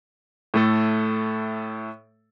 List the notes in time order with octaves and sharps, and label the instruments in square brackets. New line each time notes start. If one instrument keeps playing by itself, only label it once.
[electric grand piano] A2 A3 A4